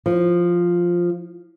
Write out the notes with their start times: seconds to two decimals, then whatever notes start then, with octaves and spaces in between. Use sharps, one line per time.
0.06 F3